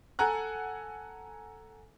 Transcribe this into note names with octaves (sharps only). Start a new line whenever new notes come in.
A4 F#5 G#5 A#5 F#6